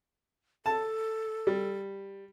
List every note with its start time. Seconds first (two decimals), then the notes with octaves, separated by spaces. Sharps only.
0.66 A4 A5
1.47 G3